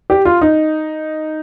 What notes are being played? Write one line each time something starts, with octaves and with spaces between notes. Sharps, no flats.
G4
F4
D#4